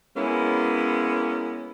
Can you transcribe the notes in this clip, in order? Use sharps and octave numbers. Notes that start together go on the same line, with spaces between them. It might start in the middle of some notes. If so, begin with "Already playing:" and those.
G#3 A#3 B3 C#4 E4